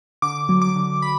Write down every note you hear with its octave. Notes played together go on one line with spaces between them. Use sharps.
D3 D6
F#3
D6
D3
B5